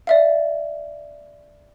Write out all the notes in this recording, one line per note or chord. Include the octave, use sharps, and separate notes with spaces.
D5 E5 F5